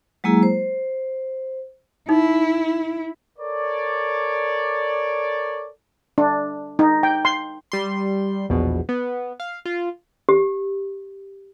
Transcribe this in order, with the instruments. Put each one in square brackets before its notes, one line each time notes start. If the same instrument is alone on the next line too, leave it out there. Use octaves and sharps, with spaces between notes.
[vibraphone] F#3 G#3 A#3 E4 G#4 A#5
C5
[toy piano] D#4 [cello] E4
[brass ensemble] A4 A#4 C#5 D5
[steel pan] D4
D#4
G5
C6
[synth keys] G3 C6
A#1 E2 B2
B3
F5
F4
[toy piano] G4